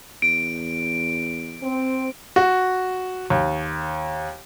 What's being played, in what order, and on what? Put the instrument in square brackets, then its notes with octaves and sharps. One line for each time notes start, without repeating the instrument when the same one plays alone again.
[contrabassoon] E2 [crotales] D7
[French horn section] C4
[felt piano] F#4
D#2